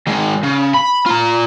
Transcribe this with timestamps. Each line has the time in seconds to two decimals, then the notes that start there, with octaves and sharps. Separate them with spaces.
0.07 D#3 G#3
0.43 C#3
0.74 B5
1.06 F4 A#5